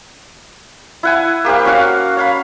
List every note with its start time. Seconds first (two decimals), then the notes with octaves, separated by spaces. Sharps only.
1.03 E4 F#5 G#5
1.45 A#3 G4 C5 F5
1.65 C#4 F#4 F5 F#5
2.17 C#5 F5 B5